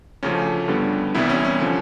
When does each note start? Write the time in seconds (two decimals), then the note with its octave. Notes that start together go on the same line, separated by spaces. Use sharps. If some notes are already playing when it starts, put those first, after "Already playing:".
0.23 D2 C#3 F3 A3 C#4
0.68 G2 D3 G3 B3
1.15 C2 C3 E3 G3 B3 E4
1.29 C#4
1.45 C#4
1.60 D3 F3 C#4